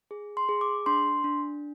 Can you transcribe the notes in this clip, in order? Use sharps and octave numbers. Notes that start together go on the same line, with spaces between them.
G#4
C6
G#4
D6
D4 C6
D4